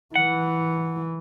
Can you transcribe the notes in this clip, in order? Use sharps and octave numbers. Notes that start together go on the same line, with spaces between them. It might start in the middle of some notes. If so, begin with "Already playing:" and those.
E3 F#5